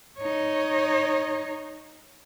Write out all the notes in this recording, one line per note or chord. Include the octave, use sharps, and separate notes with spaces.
D#4 C#5